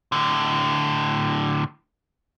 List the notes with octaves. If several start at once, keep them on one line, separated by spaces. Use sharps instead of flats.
A2 D3